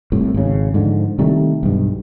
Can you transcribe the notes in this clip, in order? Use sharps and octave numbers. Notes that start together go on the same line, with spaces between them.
C2 A2
G#1 C#3
G#2 D3 F3
C3 D#3 G3 A3
B1 G2